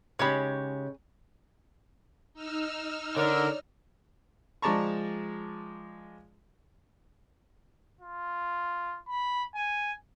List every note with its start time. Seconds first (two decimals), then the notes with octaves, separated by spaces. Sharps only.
0.19 C#3 G#3 D#4 G4 G#4 C#5 B5
2.33 D#4 E6 F6
3.17 D3 A#4 C#5 D5
4.62 F3 G#3 D5 A5 A#5 C#6
8.01 F4
9.09 B5
9.55 G#5